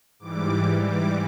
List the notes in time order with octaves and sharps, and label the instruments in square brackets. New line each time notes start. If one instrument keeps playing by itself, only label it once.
[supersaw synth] G#2 E3 G3 D6
D6